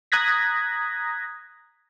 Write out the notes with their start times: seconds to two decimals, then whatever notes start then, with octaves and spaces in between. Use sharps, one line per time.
0.12 A#5 D#6 F#6 G#6 A#6 B6